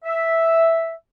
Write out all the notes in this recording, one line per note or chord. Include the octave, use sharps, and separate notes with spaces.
E5